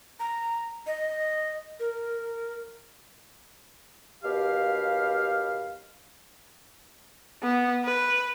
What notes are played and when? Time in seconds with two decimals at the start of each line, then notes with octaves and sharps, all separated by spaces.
0.20 A#5
0.87 D#5
1.80 A#4
4.24 D#2 B2 G4 F5
7.43 B3
7.85 B4